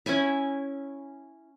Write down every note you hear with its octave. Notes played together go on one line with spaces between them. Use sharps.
C#4 E4 G#5 B5